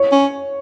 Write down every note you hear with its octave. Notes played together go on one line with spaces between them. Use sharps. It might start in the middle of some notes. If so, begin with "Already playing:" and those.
Already playing: C#5
C#4